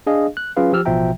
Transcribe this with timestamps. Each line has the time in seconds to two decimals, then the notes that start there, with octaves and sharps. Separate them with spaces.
0.07 D4 G#4 D#5 F5
0.37 F#6
0.57 F#3 C#4 F4 G#4 B4 F5
0.72 F3 G4 E6 F6
0.85 A1 B2 F3 E5 G5 A#5